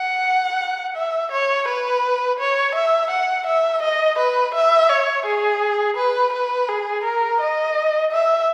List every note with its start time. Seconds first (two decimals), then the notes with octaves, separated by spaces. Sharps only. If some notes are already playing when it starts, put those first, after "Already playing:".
Already playing: F#5
0.96 E5
1.32 C#5
1.68 B4
2.39 C#5
2.75 E5
3.11 F#5
3.46 E5
3.83 D#5
4.19 B4
4.55 E5
4.90 C#5
5.26 G#4
5.97 B4
6.33 B4
6.68 G#4
7.04 A#4
7.40 D#5
8.12 E5